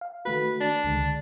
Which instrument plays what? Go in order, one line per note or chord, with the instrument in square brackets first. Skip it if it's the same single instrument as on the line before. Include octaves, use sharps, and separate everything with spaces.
[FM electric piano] F5
[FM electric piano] D#3 A3 F#4 [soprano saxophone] B4
[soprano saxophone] D4
[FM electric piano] C#2 D3 G#3